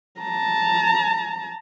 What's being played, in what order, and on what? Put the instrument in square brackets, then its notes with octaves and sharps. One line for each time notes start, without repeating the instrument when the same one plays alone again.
[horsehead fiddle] A5 A#5